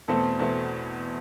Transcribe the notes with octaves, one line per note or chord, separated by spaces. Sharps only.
E2 B2 A3 C4 E4 A4
E2 B2 A3 C4 E4